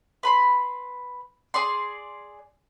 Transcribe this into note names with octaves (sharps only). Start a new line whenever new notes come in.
B4 B5 C6
G#4 D5 C6